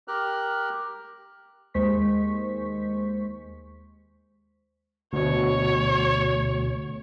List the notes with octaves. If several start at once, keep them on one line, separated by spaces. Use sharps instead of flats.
G4 A#4 F6 F#6
D#2 G#3 C5 C#6 B6
D2 B2 C#5